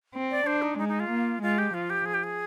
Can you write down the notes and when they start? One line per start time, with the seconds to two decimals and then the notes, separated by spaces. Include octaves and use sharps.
0.15 C4
0.31 D5
0.47 D4 C5
0.62 D#4
0.78 G#3 D#4
0.88 D#4
1.00 F4
1.10 A#3
1.42 G#3 F4
1.58 G4
1.74 F3 F4
1.90 G4
2.05 G#4
2.14 G4
2.24 G#4